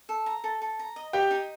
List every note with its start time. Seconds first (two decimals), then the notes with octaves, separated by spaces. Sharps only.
0.09 A4
0.26 A#5
0.44 A4
0.62 A4
0.79 A#5
0.96 D#5
1.13 D#4 G4 G5
1.31 D#4